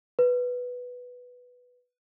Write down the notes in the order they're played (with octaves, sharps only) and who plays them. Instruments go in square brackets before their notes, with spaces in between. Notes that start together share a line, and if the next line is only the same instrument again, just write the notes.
[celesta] B4